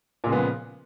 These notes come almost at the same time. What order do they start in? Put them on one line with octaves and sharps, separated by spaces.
A#2 C#3 G#3 B3 F3